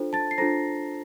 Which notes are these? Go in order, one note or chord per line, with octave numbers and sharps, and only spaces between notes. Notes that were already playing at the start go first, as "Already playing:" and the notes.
Already playing: D4 F4 A4 C5
A5 A6
C7
D4 F4 A4 C5 A#5 A#6